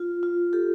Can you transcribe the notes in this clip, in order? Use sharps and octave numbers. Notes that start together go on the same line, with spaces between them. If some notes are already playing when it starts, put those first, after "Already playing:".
Already playing: F4
F4
G4 A4